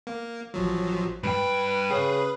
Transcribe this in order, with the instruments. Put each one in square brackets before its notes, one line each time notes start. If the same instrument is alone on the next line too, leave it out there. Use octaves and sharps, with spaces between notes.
[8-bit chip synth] A#3
A1 F3 F#3
[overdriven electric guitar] G2 G5 [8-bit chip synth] B4
[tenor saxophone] C#3 [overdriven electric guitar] G#4